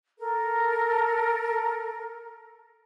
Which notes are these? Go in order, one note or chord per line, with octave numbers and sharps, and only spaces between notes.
A4 A#4